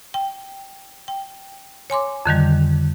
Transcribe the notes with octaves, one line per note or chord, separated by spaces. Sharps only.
G5
G5
C#5 G#5 C6 D6
F2 D3 D#3 G3